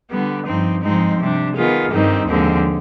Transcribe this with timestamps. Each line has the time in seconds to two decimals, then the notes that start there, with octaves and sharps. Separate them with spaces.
0.09 D3 G3 B3
0.45 G2 F3 C4 D#4
0.82 G#2 F3 G#3 C4 D#4
1.19 C3 G3 D4
1.55 D#3 B3 F4 G#4
1.92 G2 D#3 G3 C4 D#4
2.28 D#2 D3 F3 G#3 C4